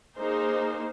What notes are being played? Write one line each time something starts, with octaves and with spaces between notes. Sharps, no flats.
A#3 D#4 G#4 C5